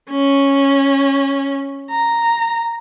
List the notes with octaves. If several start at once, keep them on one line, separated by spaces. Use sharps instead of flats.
C#4
A#5